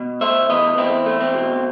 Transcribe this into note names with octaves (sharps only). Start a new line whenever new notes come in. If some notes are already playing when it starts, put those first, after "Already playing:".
Already playing: B2
A3 C5 E5
E2 B4 D#5
E2 C4 E4
A3
C4
B2